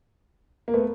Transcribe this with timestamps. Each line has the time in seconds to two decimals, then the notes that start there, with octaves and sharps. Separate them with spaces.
0.68 A#3
0.74 A3 B3